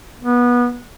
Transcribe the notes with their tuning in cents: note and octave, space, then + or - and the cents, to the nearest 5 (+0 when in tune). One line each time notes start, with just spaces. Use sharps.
B3 -20